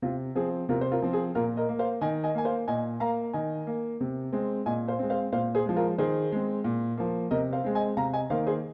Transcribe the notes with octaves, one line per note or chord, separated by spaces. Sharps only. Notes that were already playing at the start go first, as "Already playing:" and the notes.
C3 F4
F3 C4 G#4
C3 F4 A#4
C5
F4 A#4
F3 C4
G#4
A#2 F4 A#4
A#4 D#5
A#3
C5 F5
D#3 D#5 G#5
D#5 G#5
A#3 G#5
C5 F5
A#2 D#5 G#5
A#3 F5 A#5
D#3 D#5 G#5
A#3
C3
G#3 C4
A#2 D#5 G#5
C5 F5
G#3 C4
C5 F5
A#2 C5 F5
G#4 C5
F3 G#3
F4 A#4
D#3 G#4 C5
G#3 C4
A#2
F3 A#3
C3 A#4 D#5
C5 F5
G#3 C4
D#5 G#5
C3 F5 A#5
D#5 G#5
D#3 A#3 C5 F5
G#4 C5